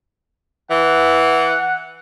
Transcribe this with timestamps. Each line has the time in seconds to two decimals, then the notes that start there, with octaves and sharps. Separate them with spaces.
0.71 E3 F#5